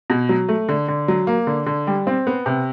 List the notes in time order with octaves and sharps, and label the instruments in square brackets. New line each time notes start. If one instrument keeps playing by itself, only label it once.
[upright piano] B2
F#3
A3
D3
D3
F#3
A#3
D3
D3
G3
C4
B3
C3